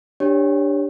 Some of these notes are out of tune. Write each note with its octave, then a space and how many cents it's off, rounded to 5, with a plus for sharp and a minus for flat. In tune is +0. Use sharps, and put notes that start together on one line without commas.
D4 +0 G4 +10 C#5 +0